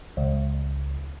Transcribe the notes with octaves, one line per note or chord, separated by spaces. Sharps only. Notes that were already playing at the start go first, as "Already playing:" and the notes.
C#2